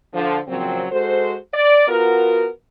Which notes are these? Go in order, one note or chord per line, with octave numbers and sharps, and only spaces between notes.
D3 F3
A#2 C#3 F3 F#3 C4
G#3 F#4 A4 C5
D5
B3 F4 F#4 A#4